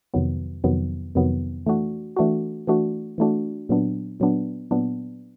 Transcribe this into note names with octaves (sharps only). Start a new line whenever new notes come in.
F2 C3 D#3 F#3 B3
F2 C3 D#3 F#3 B3
F2 C3 D#3 F#3 B3
E3 A3 D4 F#4
E3 A3 D4 F#4
E3 A3 D4 F#4
E3 A3 D4 F#4
A#2 F#3 B3 D4
A#2 F#3 B3 D4
A#2 F#3 B3 D4